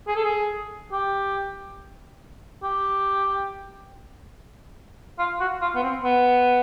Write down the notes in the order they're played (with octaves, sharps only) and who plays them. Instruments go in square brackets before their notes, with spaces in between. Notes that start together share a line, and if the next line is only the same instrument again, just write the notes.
[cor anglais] G#4
A4
G#4
G4
G4
F4
F#4
F4
B3
C4
B3